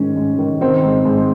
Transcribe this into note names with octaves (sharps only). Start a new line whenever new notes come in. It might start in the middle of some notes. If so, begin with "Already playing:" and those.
Already playing: G#2 D#3 C#4
G#2
D#3
D#3 C4
G#2
G#2